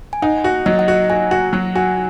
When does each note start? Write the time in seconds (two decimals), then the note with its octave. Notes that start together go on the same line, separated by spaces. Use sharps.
0.13 G#5
0.22 D#4 F#5
0.44 F#4
0.66 F#3 D#5
0.79 F#5
0.88 F#4 D#5
1.04 F#5
1.10 F#4 G#5
1.31 F#4 F#5
1.53 F#3 F#5
1.75 F#4 G#5